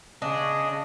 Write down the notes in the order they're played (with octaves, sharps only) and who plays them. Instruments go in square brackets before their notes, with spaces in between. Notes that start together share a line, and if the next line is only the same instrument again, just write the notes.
[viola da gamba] C#3 [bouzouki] D4 [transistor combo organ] D#5